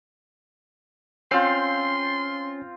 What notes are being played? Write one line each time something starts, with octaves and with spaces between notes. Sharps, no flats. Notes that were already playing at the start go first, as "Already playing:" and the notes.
C4 C#4 F4 C6 G6 C7